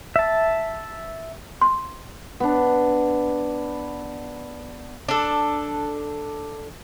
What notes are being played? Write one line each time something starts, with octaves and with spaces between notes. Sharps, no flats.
E5 A5
C6
B3 D4
D4 A4